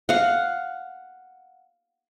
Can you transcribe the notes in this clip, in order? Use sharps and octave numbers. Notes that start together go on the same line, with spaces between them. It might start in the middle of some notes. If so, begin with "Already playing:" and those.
F5 F#5